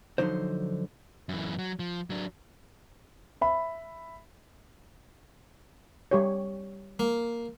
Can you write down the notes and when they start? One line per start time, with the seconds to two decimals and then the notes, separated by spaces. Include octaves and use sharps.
0.18 D3 F3 F#3 D#4 C5
1.29 F#2 E3
1.59 F#3
1.79 F3
2.10 F#3 D4
3.41 E5 B5
6.11 G3 G4 C#5
6.99 A#3